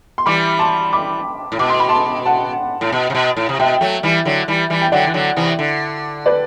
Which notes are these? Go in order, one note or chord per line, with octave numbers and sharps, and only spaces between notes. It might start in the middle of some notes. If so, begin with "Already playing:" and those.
C6
E3 G3 B5 D6
A5 C6
B5 D6
A2
B2 D6
C6
B5
A5 C6
F#5 A5
A2
B2
C3
B2
A2
C3
B2 E5 G5
F#3 A3
E3 G3
D3 F#3
E3 G3
E3 G3
G5
D3 F#3 D5 F#5
E3
D3 F#3
C3 E3
D3
B4 D5